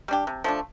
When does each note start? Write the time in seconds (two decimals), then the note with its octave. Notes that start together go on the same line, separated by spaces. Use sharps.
0.08 G3 D4 G4
0.27 C3
0.44 F3 A3 D4